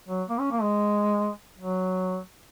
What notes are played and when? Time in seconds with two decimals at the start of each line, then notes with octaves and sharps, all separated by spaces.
0.08 F#3
0.29 A#3
0.40 C#4
0.51 A#3
0.62 G#3
1.58 F#3